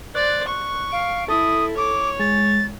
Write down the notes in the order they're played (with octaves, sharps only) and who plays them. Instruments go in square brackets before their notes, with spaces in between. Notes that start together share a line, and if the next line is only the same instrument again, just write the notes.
[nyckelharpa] C5 D5 [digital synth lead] F#6
[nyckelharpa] C#6
[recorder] F5 [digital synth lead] D7
[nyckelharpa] E4 [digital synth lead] A4 [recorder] D#6
[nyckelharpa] C#5 [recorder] D6
[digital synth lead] G#3 [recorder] A6